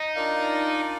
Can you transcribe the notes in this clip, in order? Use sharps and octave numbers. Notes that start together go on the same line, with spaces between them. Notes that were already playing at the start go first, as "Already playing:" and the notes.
Already playing: D#4
D4 F4 A#4 D5 F5